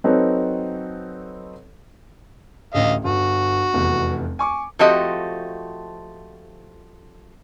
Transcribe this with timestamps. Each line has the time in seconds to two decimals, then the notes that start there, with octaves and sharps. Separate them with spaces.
0.04 F#3 C4 D#4 A4 B4 C#5
2.74 A1 D2 D#5 F5
3.04 G1 F#4
3.74 F1 E2 B3
4.39 G#5 C#6 D6
4.79 F3 A3 C4 F#4 G4 D#5